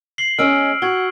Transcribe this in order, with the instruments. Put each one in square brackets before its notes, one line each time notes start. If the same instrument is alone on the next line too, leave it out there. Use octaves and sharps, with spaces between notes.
[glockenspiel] C7 F#7 G7
[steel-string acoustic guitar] G#3 C#4 D#5 [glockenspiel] E6 F6 D7
[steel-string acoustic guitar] F#4 [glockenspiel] G#6 F#7 G7